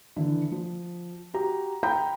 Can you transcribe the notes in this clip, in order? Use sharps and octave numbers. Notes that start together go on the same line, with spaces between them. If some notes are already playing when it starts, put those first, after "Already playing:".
D3 E3
F3
F#4 G4 A#5
G5 A#5 B5 G6